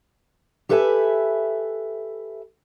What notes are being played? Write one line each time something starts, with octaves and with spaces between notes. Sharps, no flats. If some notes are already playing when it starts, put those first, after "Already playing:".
G4 A4 B4 E5 F#5 G#5